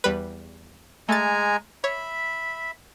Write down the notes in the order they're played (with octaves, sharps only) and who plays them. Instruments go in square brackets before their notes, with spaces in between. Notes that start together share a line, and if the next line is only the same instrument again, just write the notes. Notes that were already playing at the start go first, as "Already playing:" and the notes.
[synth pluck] E2 G3 B4
[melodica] G#3 G#5 A#5 [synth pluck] A3 A6
[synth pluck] C#5 [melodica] E5 B5